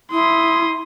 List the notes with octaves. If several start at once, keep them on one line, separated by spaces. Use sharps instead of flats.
E4 C6 D#6